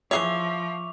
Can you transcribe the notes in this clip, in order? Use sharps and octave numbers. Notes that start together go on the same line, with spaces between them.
E3 F3 G#4 C#5 E5 C#6 D6 F7